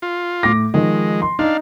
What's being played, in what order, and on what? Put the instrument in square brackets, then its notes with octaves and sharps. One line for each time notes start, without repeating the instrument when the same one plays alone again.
[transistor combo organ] F4
[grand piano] A2 D6 A#6
[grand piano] D#3 F3 [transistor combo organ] G#3
[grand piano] C6
[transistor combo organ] D4 F5 [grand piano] D#4